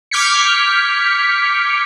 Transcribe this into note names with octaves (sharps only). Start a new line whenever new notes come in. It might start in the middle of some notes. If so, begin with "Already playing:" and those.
D6 F6 G6 G#6 B6 C#7